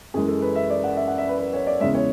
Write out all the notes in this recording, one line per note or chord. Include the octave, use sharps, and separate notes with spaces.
F#2 E3 G#3 G#4
A4
B4
E5
D5
F#5
E5
F#5
E5
B4
B4
C#5
D5
E2 C#3 G#3 E5
C#5